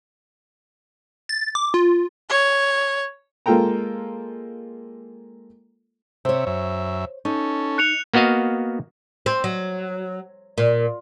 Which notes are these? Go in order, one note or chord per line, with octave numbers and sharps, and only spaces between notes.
A6
D6
F4
C#5
G#3 A#3 F4 A4 G5 A#5
C3 C5 C#5 E5
F#2 E5
C#4 D#4 A4
F#6 C#7 F7
A#3 B3 F#4 D#5 F5
C4
F#3
A#2